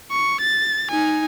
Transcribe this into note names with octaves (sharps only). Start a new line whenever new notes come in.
C#6
A6
D#4 G#5